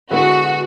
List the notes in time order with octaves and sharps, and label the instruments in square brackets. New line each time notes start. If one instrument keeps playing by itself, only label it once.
[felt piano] D3 G#3 B3 E4 B4 [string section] F#4